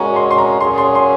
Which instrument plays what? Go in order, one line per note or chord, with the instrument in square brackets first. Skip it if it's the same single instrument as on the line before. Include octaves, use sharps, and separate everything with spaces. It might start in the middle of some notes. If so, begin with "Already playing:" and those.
Already playing: [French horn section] A#2 G#3 C#4 F#4 [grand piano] A#5
[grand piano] C6
C6
A#5
[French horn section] A#2 F#3 C#4 G#4 C#5 [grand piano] C6
[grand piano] C6
C6